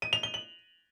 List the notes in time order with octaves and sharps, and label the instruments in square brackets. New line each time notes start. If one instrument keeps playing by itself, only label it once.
[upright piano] D#7
F7
G7
F#7